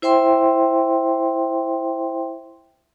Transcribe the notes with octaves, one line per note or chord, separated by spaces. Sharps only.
E4 C5 E5 G5 C6